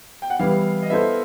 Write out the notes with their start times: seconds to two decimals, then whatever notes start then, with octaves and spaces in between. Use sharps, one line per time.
0.22 G5
0.30 F#5
0.39 E3 G3 B3 E4 F5
0.83 D#5
0.90 B3 E4 A4 C5 E5